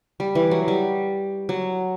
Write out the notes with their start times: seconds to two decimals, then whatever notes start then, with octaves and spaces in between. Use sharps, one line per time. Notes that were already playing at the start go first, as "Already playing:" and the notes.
0.20 G3
0.35 E3
0.51 F#3
0.68 G3
1.49 F#3